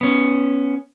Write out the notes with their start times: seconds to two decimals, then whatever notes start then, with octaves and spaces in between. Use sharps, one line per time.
0.01 B3 C#4